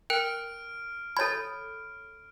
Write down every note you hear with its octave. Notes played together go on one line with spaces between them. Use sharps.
A#4 G5 F6 F#6 D7
A4 C#5 B5 G#6 A6